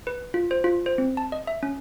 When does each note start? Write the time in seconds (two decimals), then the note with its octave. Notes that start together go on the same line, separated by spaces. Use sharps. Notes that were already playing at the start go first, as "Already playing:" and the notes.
0.07 B4
0.34 F4
0.51 C5
0.64 F4
0.86 C5
0.98 C4
1.17 A5
1.32 D#5
1.47 E5
1.63 C#4